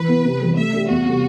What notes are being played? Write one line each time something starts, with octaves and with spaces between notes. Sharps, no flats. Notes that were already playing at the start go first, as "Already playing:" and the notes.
Already playing: E3 B4
B3 E4
C3
E3 G3
A3 E5
D4 G4
E2 F#4
C3 G3